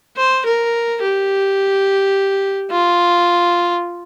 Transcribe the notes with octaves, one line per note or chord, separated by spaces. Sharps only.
C5
A#4
G4
F4